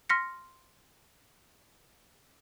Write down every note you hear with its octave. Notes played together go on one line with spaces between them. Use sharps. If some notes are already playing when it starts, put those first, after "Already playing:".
C6 F6 A#6 B6 C#7